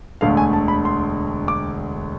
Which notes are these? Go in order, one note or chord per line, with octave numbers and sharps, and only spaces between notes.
E1 D2 D3 A3 F5
G#5
A5
B5
C6
D6